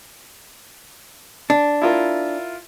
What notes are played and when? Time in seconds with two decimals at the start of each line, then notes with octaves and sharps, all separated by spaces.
1.50 D4
1.82 E4 F4 A#4